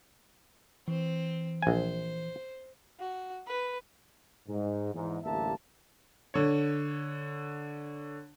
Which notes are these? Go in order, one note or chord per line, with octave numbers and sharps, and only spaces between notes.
E3 C4
A#1 C5 G#5
F#4
B4
G#2
E2 G#2
A1 D2 G3 A#3 E5 A5
D3 C#5